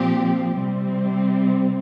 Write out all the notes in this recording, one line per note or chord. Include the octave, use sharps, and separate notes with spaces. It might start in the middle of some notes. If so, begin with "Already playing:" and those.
Already playing: A#2 F3 C4 G4
C3 G3 C4